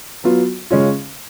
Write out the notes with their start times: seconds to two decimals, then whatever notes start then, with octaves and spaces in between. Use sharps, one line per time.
0.24 F#3 B3 F4
0.71 C#3 G#3 C#4 F4